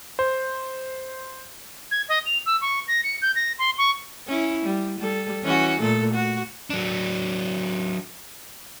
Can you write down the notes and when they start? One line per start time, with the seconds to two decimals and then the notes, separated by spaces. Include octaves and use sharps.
0.19 C5
1.91 G#6
2.09 D#5
2.26 F7
2.46 E6
2.61 C#6
2.88 A#6
3.04 C#7
3.22 G6
3.36 A#6
3.59 C6
3.78 C#6
4.27 C#4 E4
4.65 G3
4.99 G3 A4
5.43 E3 C#4 F#4
5.80 A#2 A3 A4
6.14 F#4
6.70 F#3 D4